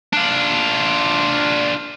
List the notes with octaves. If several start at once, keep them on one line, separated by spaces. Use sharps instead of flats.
D4 F4